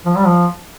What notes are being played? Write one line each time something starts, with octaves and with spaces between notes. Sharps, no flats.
F3
G3
F3